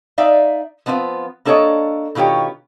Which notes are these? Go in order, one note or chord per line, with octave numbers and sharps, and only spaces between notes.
D#4 D5 E5 F5
F3 B3 C4 D#4 F4
A#3 D4 A4 C5 C#5 D#5
B2 D#3 F4 G4 C#5